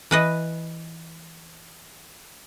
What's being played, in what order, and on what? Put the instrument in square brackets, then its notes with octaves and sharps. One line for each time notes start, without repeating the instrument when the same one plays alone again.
[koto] E3 B4 D#5